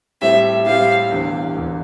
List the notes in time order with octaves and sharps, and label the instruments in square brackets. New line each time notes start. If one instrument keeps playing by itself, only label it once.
[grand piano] A2 G3 C4 G4 [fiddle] E5
[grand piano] A2 G3 C4 G4 [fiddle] F5
[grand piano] E1 E2 D3
E1 E2 D3